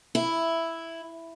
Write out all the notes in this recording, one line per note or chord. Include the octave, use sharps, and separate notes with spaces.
E4